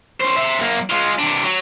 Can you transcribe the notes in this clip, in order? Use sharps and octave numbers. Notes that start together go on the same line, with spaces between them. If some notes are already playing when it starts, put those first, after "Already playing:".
C#4 C5
C5 E5
F#2 A#3
G#3 F4
C3 D4
F#3